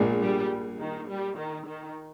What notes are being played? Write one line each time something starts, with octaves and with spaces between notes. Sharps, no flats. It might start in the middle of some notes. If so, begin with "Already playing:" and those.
Already playing: A#1 A#2 G#3 D4
G3
D#3
G3
D#3
D#3